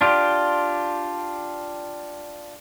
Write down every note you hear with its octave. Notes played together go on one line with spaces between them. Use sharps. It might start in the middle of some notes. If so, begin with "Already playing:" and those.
D4 F4 G4